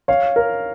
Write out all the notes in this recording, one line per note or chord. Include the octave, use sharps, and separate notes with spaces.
C#5 F5
A#4